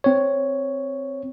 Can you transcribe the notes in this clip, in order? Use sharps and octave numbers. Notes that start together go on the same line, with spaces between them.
C4 C#5